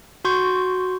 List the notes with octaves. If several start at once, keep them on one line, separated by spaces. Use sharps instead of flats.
F#4 C6 C#6 G6